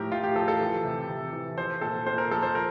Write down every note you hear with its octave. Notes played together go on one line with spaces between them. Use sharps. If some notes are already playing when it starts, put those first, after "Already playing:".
Already playing: A2 F3 G4 A#4
A2 F4
G4
F3 A4
A4
E3
C3
C3
E3
F3 C5
A#2 A4
A#2 C5
A#4
F3 A4
C5
F3 A#4